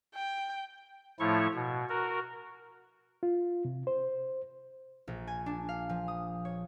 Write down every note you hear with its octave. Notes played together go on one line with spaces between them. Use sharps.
G5
A2 F3 A3 E4 C#5 C#6
B2
F#4 A#4
F4
C3
C5
A#1
G#5
D4
F5
F3
D#6
C#5